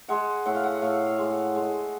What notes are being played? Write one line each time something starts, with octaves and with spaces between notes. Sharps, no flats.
G#3 F#5
A2 F#5
F5
F#5
A2 F5
F5
G#3
F#5
G#3